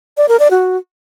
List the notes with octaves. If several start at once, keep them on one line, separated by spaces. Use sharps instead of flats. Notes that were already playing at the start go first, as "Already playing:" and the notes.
D5
A#4
D5
F#4